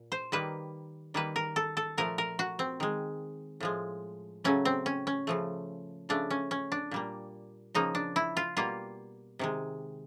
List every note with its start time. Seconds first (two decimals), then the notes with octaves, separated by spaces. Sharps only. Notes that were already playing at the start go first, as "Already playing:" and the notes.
Already playing: A#2
0.12 C5
0.32 D#3 G3 A#3 B4
1.14 D#3 G3 A#3 B4
1.36 A#4
1.56 A4
1.77 A4
1.97 A#2 F3 A3 A#4
2.18 A#4
2.39 F#4
2.59 C4
2.80 D#3 G#3
3.60 A2 F3 G#3
4.44 C#3 F#3 A3 C#4
4.65 C4
4.86 C#4
5.07 C#4
5.27 C#3 F3 A3
6.09 C#3 F3 A3 D4
6.30 C#4
6.51 C#4
6.72 D4
6.91 A#2 G3 A#3
7.74 C#3 F3 A#3 D#4
7.95 D4
8.16 E4
8.37 F4
8.57 B2 G3 A#3 F4
9.39 C3 D#3 G#3